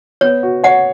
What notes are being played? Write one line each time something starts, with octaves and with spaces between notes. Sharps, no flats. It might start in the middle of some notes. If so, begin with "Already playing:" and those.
B3 C#5
F#4
C#5 F#5